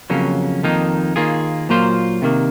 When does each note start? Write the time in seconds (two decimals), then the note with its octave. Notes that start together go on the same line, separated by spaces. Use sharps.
0.10 F2 C#3 F#3 A#3 C#4
0.63 F2 D#3 A#3 D#4
1.16 D#3 A#3 F4 G#4
1.69 A#2 F#3 A#3 F4 C5
2.22 C3 D#3 A#3